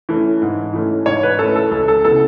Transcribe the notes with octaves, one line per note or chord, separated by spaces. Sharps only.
E3 A3 C#4
G#2
E3 A3 C#4
G#2 C#5
B4
E3 A3 C#4 A4
A4
C#2 A4
A4
C#3 E3 B3 A4